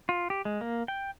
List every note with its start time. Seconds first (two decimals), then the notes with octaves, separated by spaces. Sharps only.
0.09 F4
0.30 G4
0.45 G#3
0.61 A#3
0.88 G5